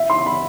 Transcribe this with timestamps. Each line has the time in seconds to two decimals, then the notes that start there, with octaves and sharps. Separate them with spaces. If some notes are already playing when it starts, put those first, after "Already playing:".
Already playing: E5
0.10 C6
0.26 B5